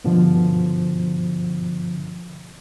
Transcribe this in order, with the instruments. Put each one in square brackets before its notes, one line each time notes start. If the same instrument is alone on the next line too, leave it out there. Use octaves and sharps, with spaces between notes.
[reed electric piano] G2 B2 D3 F3